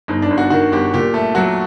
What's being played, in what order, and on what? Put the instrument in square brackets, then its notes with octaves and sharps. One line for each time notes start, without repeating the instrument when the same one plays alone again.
[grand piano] G1 D#4
D4
G1
F#4
D#3 F#4
G1 G4
A#2 G4
A3
F#3 F#4